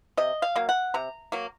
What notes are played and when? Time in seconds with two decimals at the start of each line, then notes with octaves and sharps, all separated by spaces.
0.17 C3 D#5
0.42 F5
0.56 F#3 A#3
0.69 F#5
0.94 C3 A#5
1.32 F#3 A#3